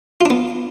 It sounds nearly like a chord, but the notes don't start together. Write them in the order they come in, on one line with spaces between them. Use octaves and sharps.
F4 D4 B3